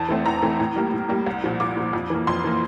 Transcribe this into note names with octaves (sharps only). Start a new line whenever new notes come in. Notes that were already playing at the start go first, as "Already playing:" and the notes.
Already playing: E2 A5
E3 A3 C4
E2 A#5
E3 A3 C4
A2
G3 A#3
A2
G3 A#3
C2
A#2 F3
C2 D6
A#2 F3
F2
E3 A#3
F2 C6
E3 A#3